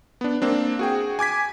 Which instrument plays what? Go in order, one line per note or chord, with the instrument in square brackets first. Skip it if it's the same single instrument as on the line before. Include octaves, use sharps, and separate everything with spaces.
[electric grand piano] B3 D4
A#3 C4 D4
F#4 G#4 G5
G#5 D6 G#6 B6